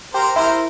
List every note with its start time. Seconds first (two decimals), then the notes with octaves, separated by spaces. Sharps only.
0.14 G4 A#4 C5
0.36 E4 A#4 C5